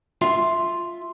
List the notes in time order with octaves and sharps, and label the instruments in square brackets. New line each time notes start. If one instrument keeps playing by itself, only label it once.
[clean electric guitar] F4 E5 C6